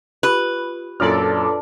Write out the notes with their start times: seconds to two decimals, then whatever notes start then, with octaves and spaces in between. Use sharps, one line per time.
0.23 F4 G4 B4
1.00 F#2 A#2 D4 F4 A4 C#5 D5 F6